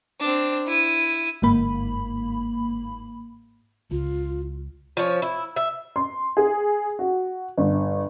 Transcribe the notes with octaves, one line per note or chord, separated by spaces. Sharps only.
C4 D4
E4 D#7
G1 G#2 A#3 B5
C#2 F4
F3 C#4
E4
E5
C6
G#4
F#4
G1